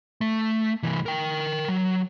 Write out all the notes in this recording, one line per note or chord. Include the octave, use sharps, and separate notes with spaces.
A3
C2 E3
A#4 G5
F#3